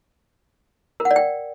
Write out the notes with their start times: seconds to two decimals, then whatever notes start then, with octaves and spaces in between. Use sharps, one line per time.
1.00 A#4
1.05 F#5
1.11 D5
1.16 G5